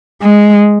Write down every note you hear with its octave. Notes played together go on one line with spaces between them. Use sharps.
G#3